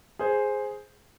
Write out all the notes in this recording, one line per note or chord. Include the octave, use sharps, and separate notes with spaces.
G#4 C5